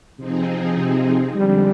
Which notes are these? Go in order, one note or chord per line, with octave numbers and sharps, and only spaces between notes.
C3 F3 C4 D#4 G#4
C3
F2 D3 G3 G#3 D4